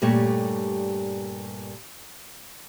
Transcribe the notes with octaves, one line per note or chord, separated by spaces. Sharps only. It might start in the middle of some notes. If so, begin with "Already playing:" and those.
G2 A#2 G3 A3 G4 C#5